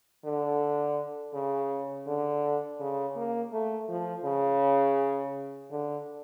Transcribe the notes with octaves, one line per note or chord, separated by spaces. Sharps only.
D3
C#3
D3
C#3
A#3
A3
F3
C#3
D3